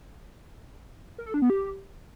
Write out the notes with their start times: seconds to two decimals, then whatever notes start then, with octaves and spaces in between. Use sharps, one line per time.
1.18 A#4
1.26 A4
1.34 D4
1.42 B3
1.50 G4